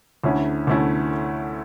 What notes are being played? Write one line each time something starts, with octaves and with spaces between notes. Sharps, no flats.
D2 D3 A3 C#4 E4
D2 D3 A3 C#4 E4